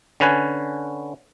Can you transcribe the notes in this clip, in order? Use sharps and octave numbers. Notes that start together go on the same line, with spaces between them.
D3 C#4 B4 G#5